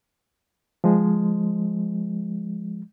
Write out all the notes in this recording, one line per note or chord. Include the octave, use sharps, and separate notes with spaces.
F3 G#3